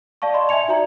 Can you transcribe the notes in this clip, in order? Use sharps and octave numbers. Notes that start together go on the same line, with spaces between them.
D5 F5 A5 C#6
D5 D#5 B5 C6
E5 G#5 G#6 C#7 F7
D#4 F#4 D5 A#5 F#7